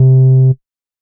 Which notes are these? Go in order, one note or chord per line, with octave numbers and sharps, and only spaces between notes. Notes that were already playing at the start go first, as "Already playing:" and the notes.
Already playing: C3